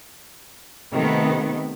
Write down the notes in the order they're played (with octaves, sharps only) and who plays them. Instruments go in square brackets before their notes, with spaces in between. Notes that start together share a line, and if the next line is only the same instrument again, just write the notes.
[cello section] C3 D#3 A3 B3